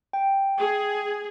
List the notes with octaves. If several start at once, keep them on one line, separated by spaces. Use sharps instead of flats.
G5
G#4